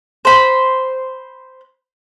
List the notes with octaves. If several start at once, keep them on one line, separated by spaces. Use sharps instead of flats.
C5 B5